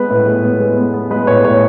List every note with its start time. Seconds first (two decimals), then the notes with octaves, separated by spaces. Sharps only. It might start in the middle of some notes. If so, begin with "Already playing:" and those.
Already playing: G#3 B3 B4
0.10 A2
0.26 G#3
0.43 B3
0.60 G#3
0.77 B3
0.93 B3
1.11 G#3 B4
1.27 A2 C#5
1.44 A2 C#5